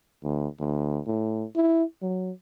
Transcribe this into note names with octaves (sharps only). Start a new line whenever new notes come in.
D2
D2
A2
E4
F#3